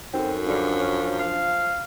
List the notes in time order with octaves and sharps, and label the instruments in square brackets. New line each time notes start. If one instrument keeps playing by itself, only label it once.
[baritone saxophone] F#2 [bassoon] C4 [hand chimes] D#4 F#4 A4
[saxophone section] D3 G3 [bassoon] F3 [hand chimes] D4
[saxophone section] C#4
F5